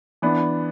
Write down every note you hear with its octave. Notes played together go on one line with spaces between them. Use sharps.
E3 B3 D4